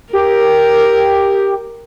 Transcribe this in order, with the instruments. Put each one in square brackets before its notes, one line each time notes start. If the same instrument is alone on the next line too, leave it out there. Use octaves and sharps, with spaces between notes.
[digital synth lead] G4 [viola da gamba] A#4